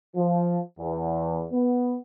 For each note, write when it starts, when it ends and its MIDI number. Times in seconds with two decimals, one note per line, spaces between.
0.16 0.58 53
0.78 1.44 40
1.52 1.96 59